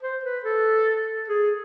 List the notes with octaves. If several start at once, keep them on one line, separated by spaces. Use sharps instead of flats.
C5
B4
A4
G#4